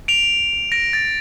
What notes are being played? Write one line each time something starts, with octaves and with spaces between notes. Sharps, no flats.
D7 F7
A#6 D7
A6